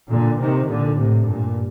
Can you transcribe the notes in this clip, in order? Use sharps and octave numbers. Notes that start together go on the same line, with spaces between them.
A#2 D3
C3 D#3
A#2 D3
A2 C3
G2 A#2